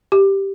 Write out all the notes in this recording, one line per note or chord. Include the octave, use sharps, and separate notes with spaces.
G4